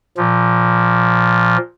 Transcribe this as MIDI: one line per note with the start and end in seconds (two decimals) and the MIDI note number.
0.17 1.57 46
0.17 1.57 53